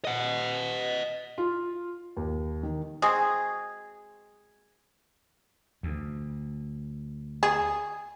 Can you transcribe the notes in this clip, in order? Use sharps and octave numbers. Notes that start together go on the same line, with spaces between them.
D#5 F#5
F4
D#2
D#3
G#3 C4 F#4 G#4
D2
G#4